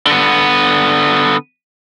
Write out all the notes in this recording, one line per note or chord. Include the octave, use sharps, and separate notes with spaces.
D3 B3